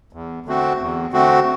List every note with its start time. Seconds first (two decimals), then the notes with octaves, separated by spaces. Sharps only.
0.13 E2
0.46 D3 A3 C4 F#4
0.80 E2
1.13 D3 A3 C4 F#4